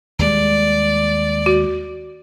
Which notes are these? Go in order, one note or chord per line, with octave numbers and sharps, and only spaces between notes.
D#2 G3 G#3 D5
F#4